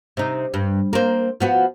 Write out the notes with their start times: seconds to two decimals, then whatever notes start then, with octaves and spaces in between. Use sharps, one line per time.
0.17 C3 D#4
0.54 G2
0.93 A#3 C4
1.40 F3 B3 F#4